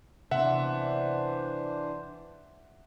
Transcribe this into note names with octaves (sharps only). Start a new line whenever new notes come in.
C3 E3 B3 D4 C5 E5 F#5